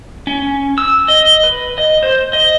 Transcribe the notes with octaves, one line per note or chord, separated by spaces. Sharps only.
C#4
E6
D#5
B4
D#5
C5
D#5